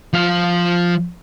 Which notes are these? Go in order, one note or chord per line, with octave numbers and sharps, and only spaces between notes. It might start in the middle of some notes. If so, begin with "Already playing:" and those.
F3 F5